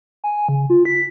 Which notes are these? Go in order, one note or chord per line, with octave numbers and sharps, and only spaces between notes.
G#5
C#3
F4
B6